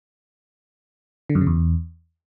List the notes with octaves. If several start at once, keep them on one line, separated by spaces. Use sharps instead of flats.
D3
F#2
C#3
E2